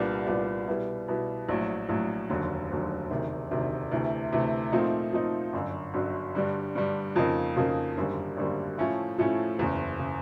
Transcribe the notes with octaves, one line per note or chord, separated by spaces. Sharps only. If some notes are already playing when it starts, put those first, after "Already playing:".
Already playing: C2 A#2 G3 B3 D4
C2 A#2 G3 B3 D4
B2 G3 B3 E4
B2 G3 B3 E4
A#1 A2 F#3
A#1 A2 F#3
F1 D#2 D3 F#3
F1 D#2 D3 F#3
E1 D2 C3 D#3
E1 D2 C3 D#3
D2 C3 E3 A3
D2 C3 E3 A3
A#2 F3 A3 C4 D#4
A#2 F3 A3 C4 D#4
G1 F#2 D3 F#3
G1 F#2 D3 F#3
G2 D3 G3
G2 D3 G3
F2 C#3 F3 A#3 D#4
F2 C#3 F3 A#3 D#4
G#1 F#2 D3 G3 A#3
G#1 F#2 D3 G3 A#3
A2 F3 A3 C#4 E4
A2 F3 A3 C#4 E4
F#1 E2 C#3
C#3